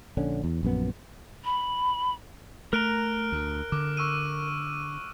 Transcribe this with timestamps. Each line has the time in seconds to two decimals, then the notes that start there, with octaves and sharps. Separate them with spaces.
0.17 A#1 D3 C#4
0.44 E2
0.63 A#1 F#2 B3
1.44 B5
2.73 A3 A#4 A#5 F6 F#6 D7
3.32 D2
3.72 D3 D6
3.97 C#6 E6 D#7